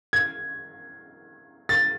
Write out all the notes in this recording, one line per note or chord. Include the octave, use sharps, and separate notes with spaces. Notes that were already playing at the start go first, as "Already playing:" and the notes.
G#6
A6